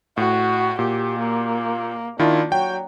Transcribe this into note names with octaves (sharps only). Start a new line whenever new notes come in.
A2 F#4
A#2 G4
A#3
D#3 D4 E4 F4
F#3 G5